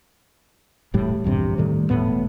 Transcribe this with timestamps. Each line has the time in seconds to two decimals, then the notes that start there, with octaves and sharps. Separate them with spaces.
0.94 E1 A2 G3
1.24 A#1 E2 G2 C3
1.58 A2 D#3 G3 A3
1.90 E1 A2 B3